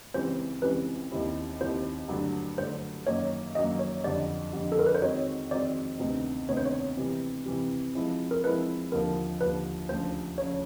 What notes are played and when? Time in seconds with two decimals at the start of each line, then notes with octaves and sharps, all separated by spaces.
0.14 C#2 C#3 E3 G3 C4 C5
0.62 C#2 C#3 E3 G3 C4 B4
1.11 D#2 D#3 G3 C4 E4
1.61 D#2 D#3 G3 C4 E4 C5
2.09 G2 D3 F#3 A3 D4
2.58 G2 D3 F#3 A3 D4 C5
3.06 F#2 D#3 F#3 A#3 C#5
3.55 F#2 D#3 F#3 A#3 D#5
3.79 C#5
4.04 F2 D3 G3 D5
4.52 F2 D3 G3
4.72 A4
4.79 A#4
4.86 B4
4.95 C5
5.02 D#3 G#3 C4 D#4 F#4 C#5
5.50 D#3 G#3 C4 D#4 F#4 D5
5.99 D2 C3 D#3 G3 B3
6.48 D2 C3 D#3 G3 B3 C#5
6.57 C5
6.65 C#5
6.97 C3 E3 G3
7.46 C3 E3 G3
7.95 F3 G#3 C4 E4
8.31 A#4
8.43 F3 G#3 C4 E4 B4
8.92 D#2 D3 F3 A#4
9.41 D#2 D3 F3 B4
9.89 D2 C#3 F3 C5
10.38 C#3 F3 C#5